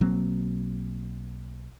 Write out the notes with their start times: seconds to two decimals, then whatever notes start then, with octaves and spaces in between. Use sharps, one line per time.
0.01 B1 F#3 A#3 C4